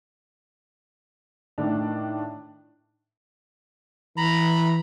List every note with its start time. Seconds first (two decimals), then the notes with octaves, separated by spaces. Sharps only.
1.58 A2 D#3 D4
4.17 E3 A#5 B5